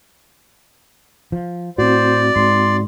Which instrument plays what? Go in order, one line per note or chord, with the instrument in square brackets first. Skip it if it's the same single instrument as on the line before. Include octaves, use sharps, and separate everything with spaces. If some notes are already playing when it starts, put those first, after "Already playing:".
[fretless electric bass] F3
[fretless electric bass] A2 [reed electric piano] C4 F#4 [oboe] C5 [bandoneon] D5
[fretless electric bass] G#2 [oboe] C6